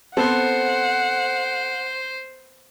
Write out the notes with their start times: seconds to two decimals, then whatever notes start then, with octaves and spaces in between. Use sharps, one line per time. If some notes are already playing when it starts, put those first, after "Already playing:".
0.17 B3 C4 A4 C5 F#5